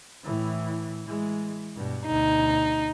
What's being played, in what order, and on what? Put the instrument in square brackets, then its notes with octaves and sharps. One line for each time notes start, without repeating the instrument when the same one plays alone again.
[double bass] A2 E3
E3 G#3
G2 B2
[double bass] D2 B2 [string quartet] D#4